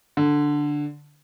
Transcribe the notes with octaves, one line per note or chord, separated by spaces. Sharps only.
D3